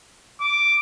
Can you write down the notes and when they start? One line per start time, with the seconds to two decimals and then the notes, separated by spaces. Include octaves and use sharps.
0.41 D6